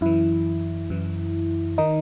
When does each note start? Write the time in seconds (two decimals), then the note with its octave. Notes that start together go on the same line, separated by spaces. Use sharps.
0.01 F#2 E3 E4
0.90 F#2 E3
1.78 D#3 D#4